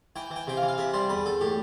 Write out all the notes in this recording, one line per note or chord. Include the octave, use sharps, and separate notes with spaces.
E3 G5
E3
G5
C3 G5
F5
E3
F5
C3 E5
G3 C5
E2 B4
E2 A4
A2 G4